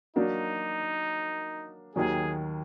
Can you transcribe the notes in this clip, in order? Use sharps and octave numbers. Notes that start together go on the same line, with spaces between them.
F#3 A#3 D4 D#4 F#4
D#2 D#3 F#3 G#4